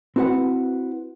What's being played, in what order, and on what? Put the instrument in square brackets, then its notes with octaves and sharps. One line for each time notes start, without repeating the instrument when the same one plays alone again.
[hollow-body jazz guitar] C4 E4 F#4 B4 F#5